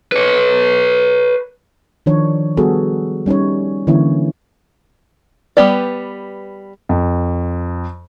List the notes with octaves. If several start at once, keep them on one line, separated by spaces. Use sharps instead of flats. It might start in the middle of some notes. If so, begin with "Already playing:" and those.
B4 C#5
D#3 F3 D4 C#5
G3 B3 F#4 G#4 A4
G3 C#4 D#4 C#5
D3 E3 A#3 C#4 E4 C#5
G3 B3 G4 B4 D5
F2